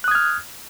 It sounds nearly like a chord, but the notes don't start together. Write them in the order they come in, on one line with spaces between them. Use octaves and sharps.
F#6 D#6 G#6 F6